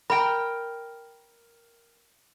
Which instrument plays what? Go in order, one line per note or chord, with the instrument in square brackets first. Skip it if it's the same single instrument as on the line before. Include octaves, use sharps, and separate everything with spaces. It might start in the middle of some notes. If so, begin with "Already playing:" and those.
[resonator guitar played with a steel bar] A#4 G5 [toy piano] B5